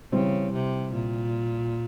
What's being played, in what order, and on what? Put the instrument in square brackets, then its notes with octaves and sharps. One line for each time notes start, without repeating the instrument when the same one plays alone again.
[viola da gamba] C#3 [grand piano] E3 G3 C4
[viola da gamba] C3
A#2